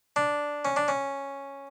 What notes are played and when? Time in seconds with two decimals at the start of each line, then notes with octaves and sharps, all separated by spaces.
0.16 D4
0.65 C#4
0.76 D4
0.88 C#4